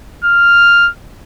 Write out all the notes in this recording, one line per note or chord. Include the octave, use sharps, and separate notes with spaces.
F6